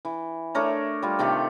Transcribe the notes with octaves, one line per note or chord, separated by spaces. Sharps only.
E3
A3 D4 A#4 C#5
G3 F4
C3 D#3 A3 G4